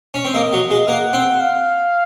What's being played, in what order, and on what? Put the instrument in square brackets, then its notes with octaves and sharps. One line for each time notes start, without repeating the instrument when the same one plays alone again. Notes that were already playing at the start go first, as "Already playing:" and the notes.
[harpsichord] C#4
C4
[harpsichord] A#3 [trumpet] D#5
[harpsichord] F#3
G#3
[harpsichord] A#3 [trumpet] F#5
[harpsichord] C4
[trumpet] F5